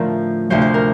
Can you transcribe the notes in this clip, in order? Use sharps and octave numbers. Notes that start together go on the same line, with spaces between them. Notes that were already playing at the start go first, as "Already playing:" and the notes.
Already playing: A2 D3 F3 A#4
D2 C3 F3 C5
C5
A#4